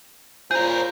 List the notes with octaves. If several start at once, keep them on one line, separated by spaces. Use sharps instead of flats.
A#2 C#3 F4 G#4 A#4 C5 G6